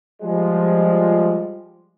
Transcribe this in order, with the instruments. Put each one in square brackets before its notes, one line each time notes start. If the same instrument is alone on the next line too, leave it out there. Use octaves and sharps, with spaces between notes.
[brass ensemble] F3 G3 G#3